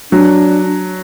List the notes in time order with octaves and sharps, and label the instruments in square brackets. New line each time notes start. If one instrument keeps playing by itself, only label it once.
[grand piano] F#3 [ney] D4